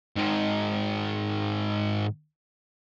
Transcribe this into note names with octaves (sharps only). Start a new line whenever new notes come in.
G#2 D#3